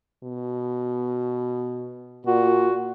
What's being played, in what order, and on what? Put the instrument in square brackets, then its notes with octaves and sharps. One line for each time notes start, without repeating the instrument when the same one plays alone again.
[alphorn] B2
[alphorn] A#2 [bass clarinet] F#4